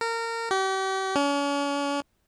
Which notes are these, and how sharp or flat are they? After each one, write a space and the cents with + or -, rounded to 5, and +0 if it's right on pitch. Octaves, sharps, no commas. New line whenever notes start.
A#4 -25
G4 -40
C#4 +40